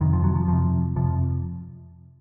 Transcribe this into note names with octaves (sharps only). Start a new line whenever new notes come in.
F2 C3 D#3
F3
F#3
F3
F2 C3 F3
F2 C3 F3